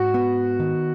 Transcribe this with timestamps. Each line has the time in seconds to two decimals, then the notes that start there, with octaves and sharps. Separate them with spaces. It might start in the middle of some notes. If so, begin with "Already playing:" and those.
Already playing: G#2 F#4
0.14 B3
0.60 D#3